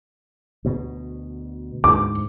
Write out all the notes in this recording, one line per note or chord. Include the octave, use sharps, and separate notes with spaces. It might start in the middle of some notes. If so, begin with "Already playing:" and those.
D2 B2
D2 G#2 D6